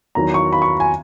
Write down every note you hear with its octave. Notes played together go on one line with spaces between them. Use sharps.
E2 D#3 F#3 A#5
C#6
B5
C#6
G#5